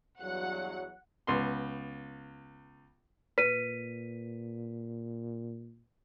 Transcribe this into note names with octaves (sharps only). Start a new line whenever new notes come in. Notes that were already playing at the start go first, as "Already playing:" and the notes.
E2 G2 F#3 F#5
C#2 B3 C6
A#2 B4 B6 D#7